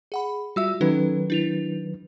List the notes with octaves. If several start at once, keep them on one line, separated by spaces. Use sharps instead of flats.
G#4 F#5 B5
G3 F4 F#4 E5 E6
D#3 F#3 C#4 D#4 A4 B4
D4 E4 F7